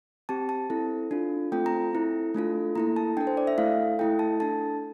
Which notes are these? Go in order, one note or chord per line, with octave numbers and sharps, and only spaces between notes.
C4 G4 A5
A5
C4 E4 A4
D4 F4 A4
A3 C4 F4 A4 G5
A#5
C4 E4 A4
A3 D4 F4 A4
A#3 E4 A4 A#5
A5
D4 A4 G5
C5
D5
E5
A3 E4 A4 F5
A3 E4 A4 G5
A5
D4 A4 A5